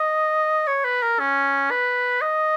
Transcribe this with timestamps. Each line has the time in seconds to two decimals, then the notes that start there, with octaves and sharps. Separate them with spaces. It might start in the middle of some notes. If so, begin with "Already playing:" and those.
Already playing: D#5
0.67 C#5
0.84 B4
1.02 A#4
1.19 C#4
1.71 B4
2.22 D#5